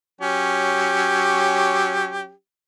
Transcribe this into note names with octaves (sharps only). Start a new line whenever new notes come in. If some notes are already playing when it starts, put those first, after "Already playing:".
F#3 C#4 G4